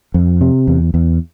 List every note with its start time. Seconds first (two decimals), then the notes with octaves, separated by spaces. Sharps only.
0.14 F2
0.41 C3
0.67 E2
0.94 E2